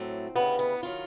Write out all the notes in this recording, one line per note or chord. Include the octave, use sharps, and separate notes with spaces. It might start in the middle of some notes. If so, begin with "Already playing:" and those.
Already playing: A2 F#3 A3 C4
D2 C#3 E3 G3 B3
B3
D#3 F#3 F4